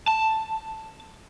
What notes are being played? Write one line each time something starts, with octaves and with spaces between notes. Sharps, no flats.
A5